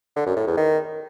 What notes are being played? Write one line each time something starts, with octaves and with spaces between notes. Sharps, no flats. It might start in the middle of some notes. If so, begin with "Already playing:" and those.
D3
F#2
A2
E2
D#3